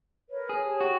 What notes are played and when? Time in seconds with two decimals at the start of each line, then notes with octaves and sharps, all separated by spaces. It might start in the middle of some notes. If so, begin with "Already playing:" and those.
0.28 A#4 B4 C#5
0.49 G#4
0.62 G4 C#5 A5
0.80 F#4 G5